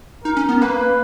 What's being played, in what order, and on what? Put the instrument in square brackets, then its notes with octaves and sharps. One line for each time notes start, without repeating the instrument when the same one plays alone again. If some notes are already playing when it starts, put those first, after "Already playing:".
[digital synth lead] D#4 [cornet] A#4
[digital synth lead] C#4
B3
[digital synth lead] A#3 [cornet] B4